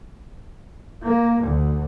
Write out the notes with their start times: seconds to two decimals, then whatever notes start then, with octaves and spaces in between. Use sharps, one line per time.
1.03 A#3
1.47 D2